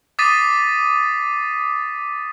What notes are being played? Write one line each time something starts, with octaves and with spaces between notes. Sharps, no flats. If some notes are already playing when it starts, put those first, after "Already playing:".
D6 D#6 A6 B6 C7 D#7